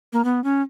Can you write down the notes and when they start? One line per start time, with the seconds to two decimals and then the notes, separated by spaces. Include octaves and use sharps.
0.13 A#3
0.25 B3
0.44 C#4